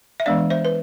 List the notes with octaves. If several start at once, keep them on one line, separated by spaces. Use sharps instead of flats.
E5
E3 G#3 B3 D4 D5 F5
C5 E5
B4